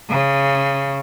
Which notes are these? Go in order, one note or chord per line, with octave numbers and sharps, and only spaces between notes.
C#3